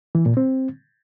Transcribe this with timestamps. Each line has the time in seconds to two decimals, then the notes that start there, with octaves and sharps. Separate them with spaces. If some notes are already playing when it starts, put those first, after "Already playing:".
0.15 E3
0.26 A#2
0.37 C4